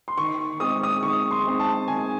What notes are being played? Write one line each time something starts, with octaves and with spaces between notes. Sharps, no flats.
C6
D#3 C#6
G#3 C4 D#6
D#6
D#3 C#6
C6
G#3 C4
A5
D#3 G#5